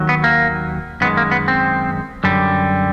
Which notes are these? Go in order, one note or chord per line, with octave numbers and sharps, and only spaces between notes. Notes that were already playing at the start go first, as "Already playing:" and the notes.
Already playing: D#2 D#3 F#3
B3
A#3
F#2 D#3 G#3 B3
A#3
B3
C4
F#2 D3 G3